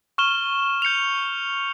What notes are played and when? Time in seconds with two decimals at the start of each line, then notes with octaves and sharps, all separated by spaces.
0.18 C#6 F6 E7 G7
0.82 G6 C#7 E7 F7